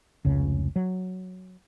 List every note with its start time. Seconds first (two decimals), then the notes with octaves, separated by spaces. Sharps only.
0.25 F1 C#2 C#3
0.76 F#3